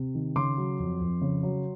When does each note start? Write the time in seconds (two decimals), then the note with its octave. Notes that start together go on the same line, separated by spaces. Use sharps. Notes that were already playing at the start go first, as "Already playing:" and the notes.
Already playing: C3
0.15 D#3
0.36 C#3 C6 D6
0.57 F#3
0.79 F2
1.00 F2
1.21 C#3
1.43 F#3